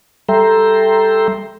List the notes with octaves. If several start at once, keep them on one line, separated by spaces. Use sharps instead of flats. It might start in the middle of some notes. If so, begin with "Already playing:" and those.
G3 A4 E5 G5 A#5 C6